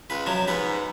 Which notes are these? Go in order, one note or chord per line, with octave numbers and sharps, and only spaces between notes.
C#2 B4
C3 F3 F#3
G#2 B3 B4